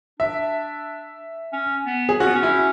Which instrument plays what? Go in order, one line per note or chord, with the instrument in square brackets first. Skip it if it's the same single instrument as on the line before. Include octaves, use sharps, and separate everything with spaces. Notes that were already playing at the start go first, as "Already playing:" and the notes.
[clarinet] D4 [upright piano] E5
[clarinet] C#4
B3
[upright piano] G#4
[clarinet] C#4 [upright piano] F#4
[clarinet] B3
C#4
[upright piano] E4